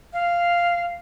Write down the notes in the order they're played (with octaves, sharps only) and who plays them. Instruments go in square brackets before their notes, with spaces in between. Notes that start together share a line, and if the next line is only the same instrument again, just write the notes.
[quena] F5